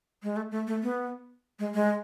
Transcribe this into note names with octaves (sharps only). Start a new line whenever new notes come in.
G#3
A3
A3
A3
B3
G#3
G#3